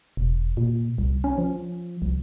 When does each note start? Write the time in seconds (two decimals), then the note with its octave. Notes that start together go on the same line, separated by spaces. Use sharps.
0.17 E1
0.57 A#2
0.98 C2
1.24 C#4
1.38 F3
2.02 C2